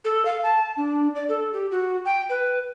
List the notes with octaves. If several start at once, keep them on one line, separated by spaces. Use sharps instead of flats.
A4
F5
A5
D4
D5
A4
G4
F#4
G5
B4